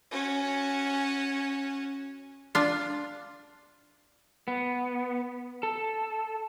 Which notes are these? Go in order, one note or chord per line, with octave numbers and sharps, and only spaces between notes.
C#4 F#4
D4 F4
B3
A4